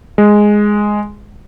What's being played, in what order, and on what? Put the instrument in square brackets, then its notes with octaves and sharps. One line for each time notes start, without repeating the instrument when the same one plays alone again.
[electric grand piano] G#3